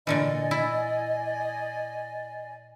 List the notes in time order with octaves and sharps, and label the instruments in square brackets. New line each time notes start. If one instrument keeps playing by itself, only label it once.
[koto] A#2 D3 E3 [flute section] D5 D#5 G#5
[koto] E4